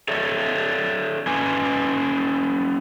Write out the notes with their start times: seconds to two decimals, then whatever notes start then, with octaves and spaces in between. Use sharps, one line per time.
0.08 A4 C#5 D5 E5
1.27 A#3 C#4 B4 G#5